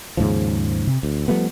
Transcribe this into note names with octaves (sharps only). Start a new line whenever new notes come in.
D#2 G#2 C#3 F3
C3
D2
F3 G3 A3 B3